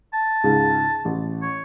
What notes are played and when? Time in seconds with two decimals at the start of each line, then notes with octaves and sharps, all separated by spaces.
0.13 A5
0.44 C#2 G#2
1.05 A1
1.42 C#5